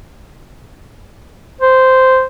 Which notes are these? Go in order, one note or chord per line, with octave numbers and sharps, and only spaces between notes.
C5